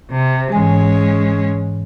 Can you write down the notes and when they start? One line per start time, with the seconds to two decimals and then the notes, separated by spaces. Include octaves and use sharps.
0.12 C3
0.52 G#2 E3 G#3 C#4 G#5